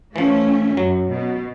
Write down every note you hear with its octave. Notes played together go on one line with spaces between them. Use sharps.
E3 F3 A3 C#4
F#2 F#3
B2